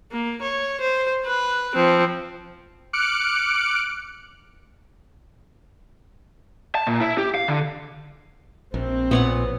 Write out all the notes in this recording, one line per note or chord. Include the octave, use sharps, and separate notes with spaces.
A#3
C#5
C5
B4
F3 C4
D6 F6 F#6 C#7 D7
A5
A#2
E4
G4
F5
D3
A#1 C4
A#2 B3 C#5 F#5